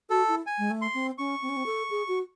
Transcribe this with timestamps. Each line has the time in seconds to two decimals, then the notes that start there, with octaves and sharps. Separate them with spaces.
0.10 F#4 A4
0.28 E4
0.46 G#5
0.58 G#3
0.70 A3
0.82 C6
0.94 C4
1.18 C#4 C#6
1.42 C4
1.49 C#4
1.57 C4
1.66 A4
1.90 G#4
2.08 F#4